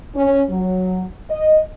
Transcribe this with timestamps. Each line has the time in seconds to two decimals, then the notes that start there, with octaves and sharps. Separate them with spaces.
0.16 C#4
0.50 F#3
1.30 D#5